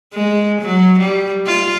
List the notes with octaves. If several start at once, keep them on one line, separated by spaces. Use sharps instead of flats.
G#3
F#3
G3
F4